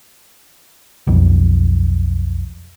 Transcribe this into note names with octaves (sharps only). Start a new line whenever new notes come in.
B1 F2